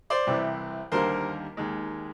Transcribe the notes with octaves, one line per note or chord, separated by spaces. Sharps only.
C5 D5
C2 C3 E3
D#2 D3 G3 A#3 A#4 C5
D#2 D#3 G#3